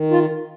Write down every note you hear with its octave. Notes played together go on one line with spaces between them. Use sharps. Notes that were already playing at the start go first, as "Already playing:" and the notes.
Already playing: D#3
F4